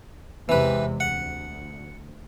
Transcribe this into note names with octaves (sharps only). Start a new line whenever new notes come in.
E2 C3 E3 G#3 B4
D2 F#5